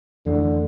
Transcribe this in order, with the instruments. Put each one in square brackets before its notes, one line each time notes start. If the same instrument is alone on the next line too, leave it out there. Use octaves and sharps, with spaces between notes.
[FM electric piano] F2 E3 A3 [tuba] D3